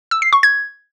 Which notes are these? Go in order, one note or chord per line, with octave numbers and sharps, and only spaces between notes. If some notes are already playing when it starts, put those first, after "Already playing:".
E6
C7
C#6
G#6